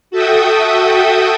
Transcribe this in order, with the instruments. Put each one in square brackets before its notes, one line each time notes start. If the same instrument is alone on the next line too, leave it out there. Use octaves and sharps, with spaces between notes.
[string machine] F#4 A4 E5 G5 D#6